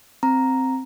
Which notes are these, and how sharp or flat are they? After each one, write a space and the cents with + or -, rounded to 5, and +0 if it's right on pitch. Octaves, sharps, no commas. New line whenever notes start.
C4 +0 A#5 +0